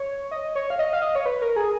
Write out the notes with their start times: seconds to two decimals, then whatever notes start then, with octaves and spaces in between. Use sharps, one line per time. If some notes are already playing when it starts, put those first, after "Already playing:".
Already playing: C#5
0.31 D#5
0.55 C#5
0.70 F5
0.79 D#5
0.93 F5
1.02 D#5
1.15 C#5
1.26 B4
1.42 A#4
1.56 G#4